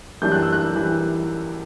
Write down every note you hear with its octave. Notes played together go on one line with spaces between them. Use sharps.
F#2 E3 G3 D4 G6
F#6
E6
F#6
E3 G3